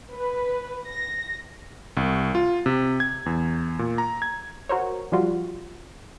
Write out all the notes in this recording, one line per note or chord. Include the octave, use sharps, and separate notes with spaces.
B4
A#6
C2
F4
C3
G#6
E2
A#2
A#5
G#6
F#4 A#4 C5 C#5
F3 G3 F4 F#4